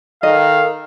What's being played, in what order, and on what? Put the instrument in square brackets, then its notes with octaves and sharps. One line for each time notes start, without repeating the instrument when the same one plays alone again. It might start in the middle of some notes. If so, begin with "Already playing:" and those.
[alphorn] D#3 [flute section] A4 A#4 [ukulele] D#5 [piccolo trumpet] F5